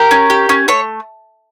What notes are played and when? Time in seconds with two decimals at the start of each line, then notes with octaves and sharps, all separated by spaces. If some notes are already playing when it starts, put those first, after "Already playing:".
Already playing: G4 A#4
0.11 C#4
0.30 G4
0.49 C#4
0.68 A3 C#5